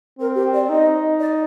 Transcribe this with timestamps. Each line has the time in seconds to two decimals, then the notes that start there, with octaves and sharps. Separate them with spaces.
0.19 C4 A#4
0.36 G4
0.53 D5
0.69 D#4 D#5
1.20 D5